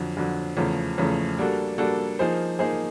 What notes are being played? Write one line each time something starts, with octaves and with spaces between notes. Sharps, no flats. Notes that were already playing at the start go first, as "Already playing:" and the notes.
Already playing: F2 D3 F#3
F2 D3 F#3
E2 C#3 F3 A3
E2 C#3 F3 A3
G3 A#3 D4 F#4 A4
G3 A#3 D4 F#4 A4
F3 A#3 D#4 G#4 C5
F3 A#3 D#4 G#4 C5